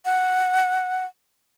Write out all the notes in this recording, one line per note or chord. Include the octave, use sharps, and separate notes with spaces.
F#5